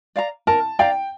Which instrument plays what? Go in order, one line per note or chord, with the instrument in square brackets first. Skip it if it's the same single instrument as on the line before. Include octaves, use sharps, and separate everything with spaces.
[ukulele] D5 F5 A#5
[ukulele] A#4 [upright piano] A5
[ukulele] D5 F5 A#5 [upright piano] G5